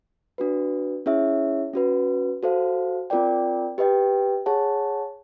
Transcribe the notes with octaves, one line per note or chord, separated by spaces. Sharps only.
D4 F#4 B4
C#4 E4 G#4 C#5 E5
C#4 F#4 B4
F#4 A4 C5 F5
C4 F4 A#4 D5 G5
G4 B4 D#5 G5
G#4 C#5 F#5 A5